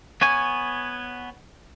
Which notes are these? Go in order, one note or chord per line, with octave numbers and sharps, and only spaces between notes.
B3 C#5 G#5